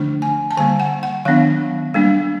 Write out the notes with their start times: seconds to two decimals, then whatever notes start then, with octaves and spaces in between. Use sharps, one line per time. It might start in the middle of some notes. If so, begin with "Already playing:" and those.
Already playing: D3 F3 A3 D4
0.22 G#5
0.51 A5
0.57 D3 G3 A#3 G#5
0.80 F#5
1.03 F#5
1.25 D#3 F#3 B3 D4 F5
1.94 G3 A#3 D4